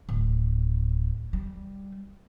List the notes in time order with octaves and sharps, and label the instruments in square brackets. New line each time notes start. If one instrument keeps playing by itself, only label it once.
[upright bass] D1
G3